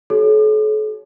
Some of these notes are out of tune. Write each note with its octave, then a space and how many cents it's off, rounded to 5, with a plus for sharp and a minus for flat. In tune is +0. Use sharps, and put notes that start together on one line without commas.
F#4 +25 A4 -45 C#5 +0